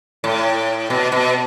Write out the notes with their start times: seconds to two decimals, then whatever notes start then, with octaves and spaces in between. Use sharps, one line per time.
0.24 A2
0.90 B2
1.12 B2